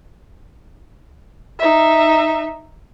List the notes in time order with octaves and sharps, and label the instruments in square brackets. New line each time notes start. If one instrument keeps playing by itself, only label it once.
[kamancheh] D#4 E5